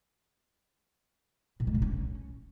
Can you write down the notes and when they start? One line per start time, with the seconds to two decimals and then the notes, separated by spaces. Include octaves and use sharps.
1.60 A#2
1.67 G#3
1.75 G3
1.82 C#4